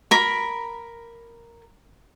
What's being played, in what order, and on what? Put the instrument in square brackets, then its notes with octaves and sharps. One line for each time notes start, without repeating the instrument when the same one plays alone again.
[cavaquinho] A#4 B5